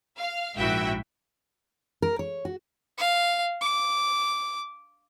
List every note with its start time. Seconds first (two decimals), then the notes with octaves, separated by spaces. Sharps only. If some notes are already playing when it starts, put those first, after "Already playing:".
0.19 F5
0.57 A#1 G#2 E4 F#4 E5 G5
2.02 A#4
2.19 C#5
2.45 F#4
2.98 F5
3.61 D6